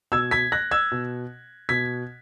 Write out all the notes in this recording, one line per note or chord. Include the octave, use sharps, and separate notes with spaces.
B2 E6 G#6
G#6 B6
F#6 A#6
E6 G#6
B2
B2 G#6 B6